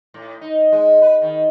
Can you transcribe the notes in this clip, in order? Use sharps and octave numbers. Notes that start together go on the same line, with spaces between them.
A2
D#4
G#3
B4
D#3